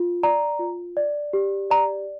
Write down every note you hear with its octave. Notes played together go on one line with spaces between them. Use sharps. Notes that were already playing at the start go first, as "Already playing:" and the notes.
Already playing: F4
D5 A#5
F4
D5
G4
D5 A#5